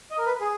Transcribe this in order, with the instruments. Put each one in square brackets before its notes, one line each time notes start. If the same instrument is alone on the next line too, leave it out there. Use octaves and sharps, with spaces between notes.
[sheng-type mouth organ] D#5
A#4
B4
G#4